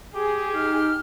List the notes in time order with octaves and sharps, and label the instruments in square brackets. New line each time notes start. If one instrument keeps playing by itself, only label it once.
[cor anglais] G4 [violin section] G#4
[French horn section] D#4 [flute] F6